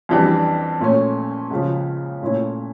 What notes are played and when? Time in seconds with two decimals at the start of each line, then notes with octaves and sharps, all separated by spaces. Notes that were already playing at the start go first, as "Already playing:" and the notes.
0.09 F2 E3 G3 D4
0.81 A#2 A3 C#4
1.50 C#2 C#3 F3
2.22 A#2 A3 C#4 E4